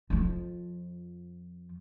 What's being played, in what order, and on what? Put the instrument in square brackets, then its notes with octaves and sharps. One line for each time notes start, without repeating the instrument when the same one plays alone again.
[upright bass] F2 F3